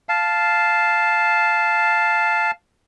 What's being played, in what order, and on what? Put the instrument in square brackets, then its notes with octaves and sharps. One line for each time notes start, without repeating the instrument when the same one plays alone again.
[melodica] F5 A5